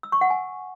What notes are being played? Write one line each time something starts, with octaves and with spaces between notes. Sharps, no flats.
E6
C#6
F#5
G#5